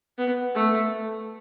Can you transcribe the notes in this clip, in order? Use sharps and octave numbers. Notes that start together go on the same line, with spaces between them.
B3
A3